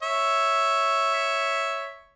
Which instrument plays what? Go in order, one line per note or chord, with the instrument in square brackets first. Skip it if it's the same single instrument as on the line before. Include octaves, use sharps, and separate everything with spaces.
[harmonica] C#5 E5